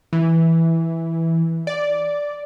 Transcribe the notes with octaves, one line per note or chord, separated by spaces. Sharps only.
E3
D5